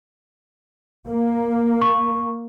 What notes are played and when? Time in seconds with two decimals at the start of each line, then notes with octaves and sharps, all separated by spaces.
1.08 A#3
1.81 C#6